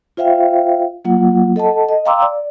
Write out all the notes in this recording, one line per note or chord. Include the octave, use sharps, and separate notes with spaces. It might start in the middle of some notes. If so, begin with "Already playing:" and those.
F4 C5 E5 F5 G5
F#3 A#3 F4 F#5
A4 D#5 F#5 A5
D#5
F5 G5 A#5 C6 D6 E6
D5